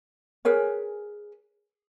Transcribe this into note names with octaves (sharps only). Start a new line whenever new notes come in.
G#4 A#4 B4 C#5